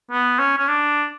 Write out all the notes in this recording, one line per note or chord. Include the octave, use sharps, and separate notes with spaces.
B3
C#4
C#4
D4